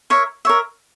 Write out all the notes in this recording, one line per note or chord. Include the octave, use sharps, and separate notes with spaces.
A#4 C#5 E5
A#4 C#5 E5